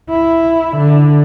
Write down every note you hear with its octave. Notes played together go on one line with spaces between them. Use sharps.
E4
D3